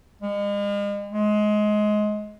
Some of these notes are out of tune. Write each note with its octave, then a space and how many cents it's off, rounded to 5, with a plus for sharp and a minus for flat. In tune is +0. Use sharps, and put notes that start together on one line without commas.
G#3 -40
G#3 +20